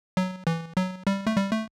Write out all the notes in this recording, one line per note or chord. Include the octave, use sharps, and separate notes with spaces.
F#3
E3
F#3
G3
A3
G3
A3